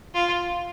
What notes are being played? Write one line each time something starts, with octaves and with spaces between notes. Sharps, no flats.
F4